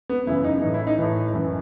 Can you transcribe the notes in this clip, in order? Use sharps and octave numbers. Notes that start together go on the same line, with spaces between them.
B3
F#2 C#3 E3 E4
D#4
A2 E3 D#4
E4
D#4
A2 E3
F#2 E3